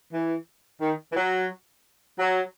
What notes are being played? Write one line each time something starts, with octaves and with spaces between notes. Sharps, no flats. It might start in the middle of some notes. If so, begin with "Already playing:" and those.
E3
D#3
E3
F#3
F#3